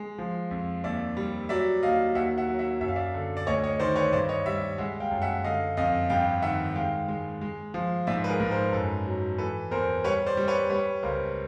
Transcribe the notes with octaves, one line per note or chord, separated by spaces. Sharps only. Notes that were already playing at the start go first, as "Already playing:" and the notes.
Already playing: G#3
F3
F2
D#2 D5 E5
G3
F#3 D5 E5
D#2 D#5 F5
D#2 E5 F#5
E5 F#5
F#3
E5 F#5
F#2 E5
F5
D5 E5
D3
D5
D2 C#5 D#5
C#5 D#5
D#3 C5 D5
B4 C#5
G2 C5 D5
C#5 D#5
G3 D5 E5
G#3 E5 F#5
F5 G5
F#2
E5 F#5
D3 D#5 F5
F2 D#5 F5
G2 F5 G5
D#3 E5 F#5
G#3 F5 G5
G#3
G#3
F3
G#2 D5 E5
B4
G#4 A#4
G#2
A#4 C5
F#2 A4 B4
F#3
E3 A4 B4
E2 A#4 C5
G3 B4 C#5
C5 D5
G3
B4 C#5
G3 B4 C#5
C#2 A#4 C5